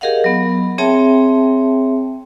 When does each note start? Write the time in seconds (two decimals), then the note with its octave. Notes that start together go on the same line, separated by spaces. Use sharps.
0.01 G4 G#4 A#4 D#5 F5 F#5
0.24 F#3 B3
0.78 C4 G#4 C#5 E5 G5 A5